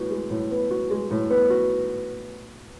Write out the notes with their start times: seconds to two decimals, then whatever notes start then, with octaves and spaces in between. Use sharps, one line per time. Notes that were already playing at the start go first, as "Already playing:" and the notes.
Already playing: A2 B3 F#4
0.11 G#3
0.30 A2
0.51 B3
0.71 F#4
0.91 G#3
1.11 A2
1.30 B3
1.50 F#4